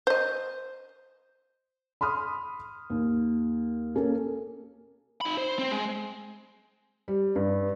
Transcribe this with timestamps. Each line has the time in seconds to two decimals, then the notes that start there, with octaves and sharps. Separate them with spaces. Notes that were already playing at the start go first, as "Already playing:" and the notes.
0.07 C5 D#5
2.01 B5 C6 D#6 F6
2.90 D#2
3.95 A#3 C#4 A4 A#4
5.21 D#4 B5
5.38 C5
5.59 C4 C5
5.71 G#3
7.08 G3
7.36 G2